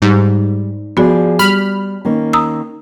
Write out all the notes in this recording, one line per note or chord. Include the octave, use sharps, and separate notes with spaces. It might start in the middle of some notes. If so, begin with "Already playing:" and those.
G#2 G3
F3 B3 F#4 G#4 D5
G3 B5 F6
D#3 A#3 C#4
A#5 D#6 E6